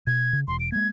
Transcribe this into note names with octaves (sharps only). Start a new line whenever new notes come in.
B2 G#6
C#3
E1 C6
D7
G#3 A#3 G#6